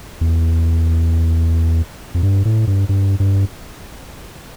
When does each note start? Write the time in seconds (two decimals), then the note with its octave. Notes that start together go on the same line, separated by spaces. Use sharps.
0.21 E2
2.14 F2
2.23 G2
2.45 A2
2.67 G2
2.89 G2
3.20 G2